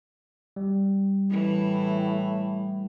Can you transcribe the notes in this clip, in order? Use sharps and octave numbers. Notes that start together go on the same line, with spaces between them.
G3
A2 E3